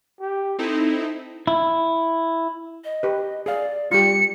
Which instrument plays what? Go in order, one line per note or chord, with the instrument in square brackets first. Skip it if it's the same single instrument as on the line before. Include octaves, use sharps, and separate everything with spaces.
[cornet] G4
[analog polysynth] C4 D#4 E4 [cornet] A4
[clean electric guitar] E4
[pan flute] D#5
[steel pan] G4 B4
[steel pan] G#4 F5 [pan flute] D5
[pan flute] G3 [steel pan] F4 G4 [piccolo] C#7